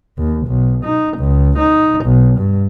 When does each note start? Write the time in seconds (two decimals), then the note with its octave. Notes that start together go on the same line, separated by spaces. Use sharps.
0.18 D#2
0.47 B1
0.84 D#4
1.18 C#2
1.58 D#4
2.05 B1
2.38 G2